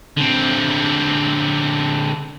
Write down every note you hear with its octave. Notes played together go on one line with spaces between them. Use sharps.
D3 C4